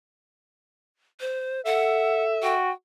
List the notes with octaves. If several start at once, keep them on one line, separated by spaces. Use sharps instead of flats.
C5
A4 E5 F#5
F#4 G5